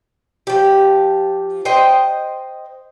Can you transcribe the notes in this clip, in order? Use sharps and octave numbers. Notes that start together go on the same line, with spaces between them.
F3 G4
C5 D#5 G5